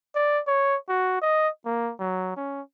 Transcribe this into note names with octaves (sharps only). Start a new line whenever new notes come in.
D5
C#5
F#4
D#5
A#3
F#3
C#4